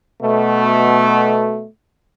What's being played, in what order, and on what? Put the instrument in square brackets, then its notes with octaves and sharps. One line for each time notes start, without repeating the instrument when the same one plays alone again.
[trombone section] B2 A3